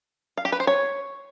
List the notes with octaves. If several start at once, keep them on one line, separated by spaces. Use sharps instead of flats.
F5
G4
B4
C5
C#5